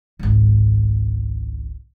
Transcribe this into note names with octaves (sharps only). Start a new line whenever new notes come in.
G#1 C#2